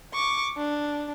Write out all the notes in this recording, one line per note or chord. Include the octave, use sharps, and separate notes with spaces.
C#6 D6
D4